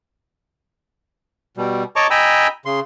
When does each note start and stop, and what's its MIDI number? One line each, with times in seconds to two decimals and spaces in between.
1.57 1.83 47
1.57 1.83 55
1.96 2.07 73
1.96 2.07 75
1.96 2.07 81
1.96 2.07 82
1.96 2.07 85
1.96 2.07 86
2.11 2.47 75
2.11 2.47 79
2.11 2.47 80
2.11 2.47 82
2.11 2.47 83
2.11 2.47 88
2.65 2.80 49
2.65 2.80 84